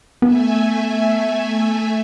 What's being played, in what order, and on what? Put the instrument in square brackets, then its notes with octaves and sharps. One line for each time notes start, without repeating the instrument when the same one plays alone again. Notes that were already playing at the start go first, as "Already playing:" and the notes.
[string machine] A3 E5 G#5 [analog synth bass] B3